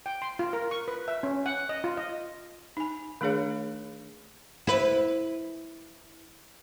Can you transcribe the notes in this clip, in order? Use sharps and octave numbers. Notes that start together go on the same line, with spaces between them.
G5
C6
F4
A#4
C#6
B4
E5
C#4
F#5
D#5
F4
D#5
D#4 G#5
D#3 A3 D4 G#4 C#5 F5
E4 B4